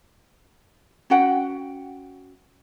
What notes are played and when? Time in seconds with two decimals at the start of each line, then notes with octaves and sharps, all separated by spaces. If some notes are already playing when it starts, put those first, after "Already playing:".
1.10 C#4 F#4 F#5 G5